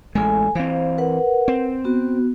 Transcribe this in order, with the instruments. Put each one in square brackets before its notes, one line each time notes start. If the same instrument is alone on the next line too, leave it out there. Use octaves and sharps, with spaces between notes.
[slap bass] A1 G#3 [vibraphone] A4 G#5
[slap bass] E3 C4 [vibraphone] C5 F5
[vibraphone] A#4 B4 F#5
[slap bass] C4
[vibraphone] B3 F#4